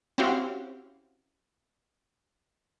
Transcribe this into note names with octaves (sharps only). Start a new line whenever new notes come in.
C4 C#4 E4 F#4 G4 F5